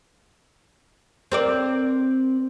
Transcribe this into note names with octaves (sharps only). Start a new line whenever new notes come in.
C4 A#4 D5